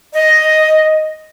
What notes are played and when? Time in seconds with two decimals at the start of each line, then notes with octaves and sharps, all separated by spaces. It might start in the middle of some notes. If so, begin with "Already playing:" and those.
0.12 D#5